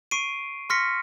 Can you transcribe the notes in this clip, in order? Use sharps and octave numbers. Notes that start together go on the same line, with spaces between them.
C#6 C7 D7 D#7
C6 C#6 F6 A#6 B6 C#7